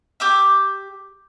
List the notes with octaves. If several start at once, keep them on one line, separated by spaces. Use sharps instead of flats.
G4 D6 E6